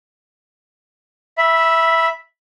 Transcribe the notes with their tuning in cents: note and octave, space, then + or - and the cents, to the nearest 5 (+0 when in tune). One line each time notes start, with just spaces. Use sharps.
E5 +0 B5 -15